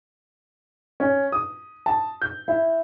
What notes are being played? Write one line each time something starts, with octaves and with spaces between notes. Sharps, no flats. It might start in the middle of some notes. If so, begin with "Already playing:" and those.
C#4
D#6
A5
G6
E4